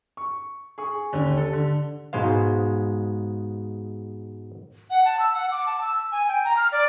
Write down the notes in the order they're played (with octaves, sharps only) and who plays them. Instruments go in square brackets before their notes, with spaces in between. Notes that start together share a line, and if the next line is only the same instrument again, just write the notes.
[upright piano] C#6
G#4 C#6
D#2 D3 C#4
C3 A4
D3
[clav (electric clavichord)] G#2 B2 G#3 C5 F5
[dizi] F#5
A5
E6
F#5
D6
A5
E6
G#5
G5
A#5
F6
D5